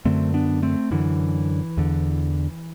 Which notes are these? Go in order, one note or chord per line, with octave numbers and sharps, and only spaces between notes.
F#2 D3 A3 C4
B3 D4
A3 C4
F#2 D3 E3
E2 D3